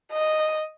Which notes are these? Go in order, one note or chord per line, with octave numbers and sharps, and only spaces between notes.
D#5